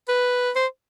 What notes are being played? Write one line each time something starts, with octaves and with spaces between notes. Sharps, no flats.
B4
C5